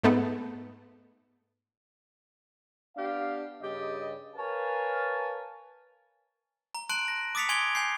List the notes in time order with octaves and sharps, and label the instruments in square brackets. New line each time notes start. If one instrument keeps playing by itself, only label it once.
[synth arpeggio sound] G#2 A3 B3
[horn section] B3 D4 G4 F5
G2 C#3 G4 D5 D#5
A#4 B4 C#5 F5 G#5 A5
[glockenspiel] A#5
A5 C6 F#6 D7 F#7
A#6
D6 D#6 A6 B6 C#7 F7
G#5 C6 G#6 D7 F7 G7
G#5 G6 C7